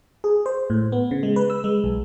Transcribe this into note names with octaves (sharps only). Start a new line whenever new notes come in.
G#4
C5
A2
B3
C#3
G#3
B4
E6
G#3
B1